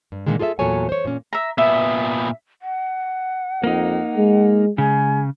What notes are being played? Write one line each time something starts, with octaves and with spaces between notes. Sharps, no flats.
G2
A#2 D3 D#3 G#3
F4 G#4 A4 D#5 E5
E2 A#2 F#3 A4 C#5 G#5
C5 C#5
A#2 C#4
E5 A#5
A#2 B3 E5
F#5
F2 A#3 D#4
G#3
C#3 G#3 G#5